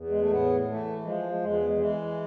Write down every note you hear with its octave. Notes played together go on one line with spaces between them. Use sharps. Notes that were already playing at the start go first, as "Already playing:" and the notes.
Already playing: E2
G#3
A3
A2 B3
E3 A3
F3 G#3
E2 G#3
E3 G#3